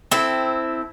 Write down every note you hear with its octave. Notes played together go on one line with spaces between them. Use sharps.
C4 E4 A4